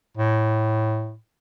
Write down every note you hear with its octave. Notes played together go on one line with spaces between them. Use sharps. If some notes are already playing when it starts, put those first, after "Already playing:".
A2